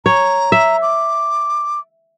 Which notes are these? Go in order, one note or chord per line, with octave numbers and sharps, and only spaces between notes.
C#5 A#5
E5
D6